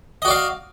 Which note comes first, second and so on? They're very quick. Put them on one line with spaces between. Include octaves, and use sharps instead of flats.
D#5 F#4 D5 F5